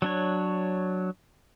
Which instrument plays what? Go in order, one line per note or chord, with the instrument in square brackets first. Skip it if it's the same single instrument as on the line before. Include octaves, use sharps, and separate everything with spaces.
[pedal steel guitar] F#3 D4 C#5